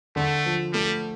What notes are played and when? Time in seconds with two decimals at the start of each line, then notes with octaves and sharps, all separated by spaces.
0.16 D3 A3
0.46 F3
0.73 G3 A3